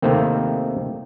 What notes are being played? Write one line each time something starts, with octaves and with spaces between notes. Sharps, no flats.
C3 D#3 A3 A#3 C4